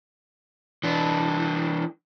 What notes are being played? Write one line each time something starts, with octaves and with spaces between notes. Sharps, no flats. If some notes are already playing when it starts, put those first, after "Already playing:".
E3 D4